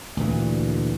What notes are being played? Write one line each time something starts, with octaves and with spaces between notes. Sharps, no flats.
D2 A#2 E3